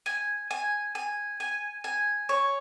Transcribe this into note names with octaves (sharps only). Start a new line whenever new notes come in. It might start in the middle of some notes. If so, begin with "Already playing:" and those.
G#5
G#5
G#5
G#5
G#5
C#5